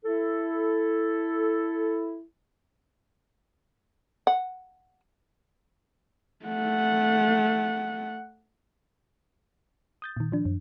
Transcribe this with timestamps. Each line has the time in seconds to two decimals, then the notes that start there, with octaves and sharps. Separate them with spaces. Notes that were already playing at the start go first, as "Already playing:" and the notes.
0.05 E4 A4
4.27 F#5
6.46 A3 F#5
10.02 D#6 G6 A6
10.17 A#2 D#3
10.32 F3 D4
10.45 F#2